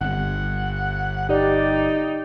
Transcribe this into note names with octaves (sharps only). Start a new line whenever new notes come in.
G1 F#5
D#4 G4 D5